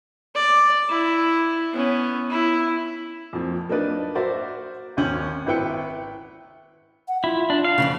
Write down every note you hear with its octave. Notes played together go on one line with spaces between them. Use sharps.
D5
E4
B3 C#4
E4
F2 A#2 F3
F#3 A#3 D4 D#4 B4 D5
F#4 A#4 C5 D5 E5 F#5
G#1 D#2 C#4 G6 F#7
G#1 E4 B4 G5 C#7
F#5
E4 F4
D4
F5
F2 A2 C#3